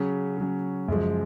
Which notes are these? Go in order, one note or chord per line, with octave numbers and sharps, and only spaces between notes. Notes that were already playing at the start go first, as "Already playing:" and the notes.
Already playing: C#3 F#3 C#4
C#3 F#3 C#4
F#2 C#3 F3 G#3